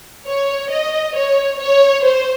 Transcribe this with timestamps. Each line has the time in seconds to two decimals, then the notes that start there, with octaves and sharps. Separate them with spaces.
0.27 C#5
0.72 D#5
1.16 C#5
1.59 C#5
2.04 C5